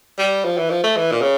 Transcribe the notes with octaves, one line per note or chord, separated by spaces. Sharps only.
G3
F3
E3
F3
A3
E3
A#2
C#3